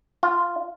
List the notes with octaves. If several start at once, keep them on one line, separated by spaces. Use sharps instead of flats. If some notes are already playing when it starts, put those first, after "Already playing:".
F4